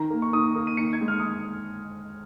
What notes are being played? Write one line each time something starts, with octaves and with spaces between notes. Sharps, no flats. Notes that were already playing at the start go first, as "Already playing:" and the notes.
Already playing: D#3 A#5
A#3
C#6
D#3 D#6
A#3
D#7
D#3 C#7
G#6
G#3
F6
D#6